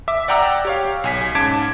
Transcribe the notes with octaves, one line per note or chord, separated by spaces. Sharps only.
E5 D6
D5 F#5 G5 A#5 D6 E6
G4 C#5 F5
B1 G#5 B6
G#2 C#4 A5 D6 G#6 D7